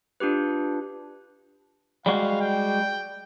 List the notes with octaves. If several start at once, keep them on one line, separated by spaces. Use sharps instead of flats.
D4 F4 G4 B4
G3 G#3 F#4 F5
G5